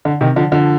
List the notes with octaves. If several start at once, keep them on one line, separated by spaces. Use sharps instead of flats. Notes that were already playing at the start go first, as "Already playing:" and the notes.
D3
C3 D#3
D3 F3
D3 F3